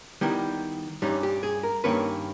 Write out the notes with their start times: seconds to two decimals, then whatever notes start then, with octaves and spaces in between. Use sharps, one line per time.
0.21 D#3 G3 B3 E4
1.02 G2 G3 C#4 D#4
1.23 G4
1.43 G#4
1.63 A#4
1.84 G2 D#3 A#3 C#4 B4